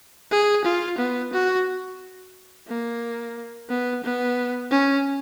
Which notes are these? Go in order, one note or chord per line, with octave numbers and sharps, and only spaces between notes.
G#4
F4
B3
F#4
A#3
B3
B3
C#4